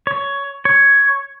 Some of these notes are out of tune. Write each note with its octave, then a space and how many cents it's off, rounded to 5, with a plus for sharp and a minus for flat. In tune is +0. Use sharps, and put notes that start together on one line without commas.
C#5 +10
C#5 +5